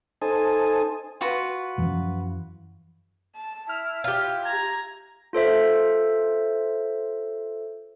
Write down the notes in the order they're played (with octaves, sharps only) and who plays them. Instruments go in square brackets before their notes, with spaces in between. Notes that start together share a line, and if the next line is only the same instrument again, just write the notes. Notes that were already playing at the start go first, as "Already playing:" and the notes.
[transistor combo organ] D#4 A4 C5 G#5 A5 D#6
[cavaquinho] F4 F#4 B4
[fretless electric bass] F#2 E3 F3
[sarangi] A5
[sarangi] E4 [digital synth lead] F6
[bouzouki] F4 G4
[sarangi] A#5 [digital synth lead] G#6
[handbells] F4 A4 C5 E5